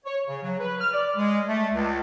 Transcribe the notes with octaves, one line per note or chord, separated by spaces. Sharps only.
C#5
C#3
F#3
B4
F6
D5
G#3
A3
C#2